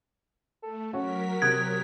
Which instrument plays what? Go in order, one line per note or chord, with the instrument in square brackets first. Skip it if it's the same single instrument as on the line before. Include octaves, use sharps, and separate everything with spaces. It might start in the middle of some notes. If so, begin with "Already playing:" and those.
[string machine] A3 [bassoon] A4
[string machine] F#3 A#4 B6 [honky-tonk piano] C#4 [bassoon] F#4
[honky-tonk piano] C3 D#6 F#6 [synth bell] G#6